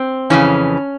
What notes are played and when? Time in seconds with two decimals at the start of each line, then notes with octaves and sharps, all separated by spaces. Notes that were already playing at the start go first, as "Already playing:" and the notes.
Already playing: C4
0.30 F2 C#3 E3 C#4